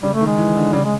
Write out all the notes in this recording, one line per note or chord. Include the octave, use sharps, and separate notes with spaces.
C#3 G3
A3
D#3
G#3
E3
D3
C#3 G3
G#3